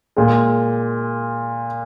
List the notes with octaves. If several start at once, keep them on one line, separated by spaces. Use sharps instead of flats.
A#2 G#3